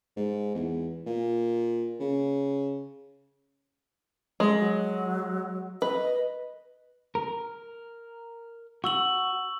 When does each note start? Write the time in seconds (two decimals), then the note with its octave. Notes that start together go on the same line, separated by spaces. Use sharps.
0.16 G#2
0.55 E2
1.06 A#2
2.00 C#3
4.40 G#3
4.59 F#3
5.82 B4 D#5
7.15 A#4
8.84 F#4 C#6 E6 F#7